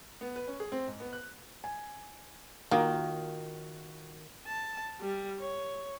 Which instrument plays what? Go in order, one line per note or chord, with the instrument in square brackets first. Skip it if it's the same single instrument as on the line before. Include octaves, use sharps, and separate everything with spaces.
[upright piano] B3
B4
C#4
G#4
C4
G#2
B3
F#6
[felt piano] G#5
[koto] D#3 [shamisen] A#3 [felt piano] F4 F#4
[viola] A5
G3
C#5